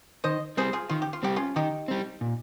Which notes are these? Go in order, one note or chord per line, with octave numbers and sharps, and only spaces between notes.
D#3 C5 D#5
G3 C4 G#4 C5
F4 G#4
D#3 F4
G4
F4
G3 C4 G4
C#4 F4
D#3 D#4 G4
G3 C4
A#2